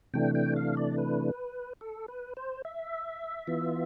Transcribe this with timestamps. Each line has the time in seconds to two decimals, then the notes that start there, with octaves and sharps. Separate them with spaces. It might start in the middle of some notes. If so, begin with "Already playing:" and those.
0.14 C3 E3 A3 D4 G5
0.35 G5
0.56 F5
0.77 D5
0.98 B4
1.81 A4
2.08 B4
2.37 C5
2.65 E5
3.47 E3 B3 F4